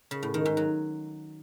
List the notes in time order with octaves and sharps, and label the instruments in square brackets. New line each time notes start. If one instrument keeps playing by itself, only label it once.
[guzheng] C#3
A2
D#3
G#2
F#3